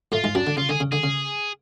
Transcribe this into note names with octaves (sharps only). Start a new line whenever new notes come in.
A2 A3 F4
G#2 G#3
F#2 F#3 D4
D3
C#3 F4
D3 G#4
C#3
D3 G#4
C#3